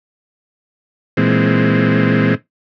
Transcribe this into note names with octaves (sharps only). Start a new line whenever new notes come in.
A#2 E3 G#3 C4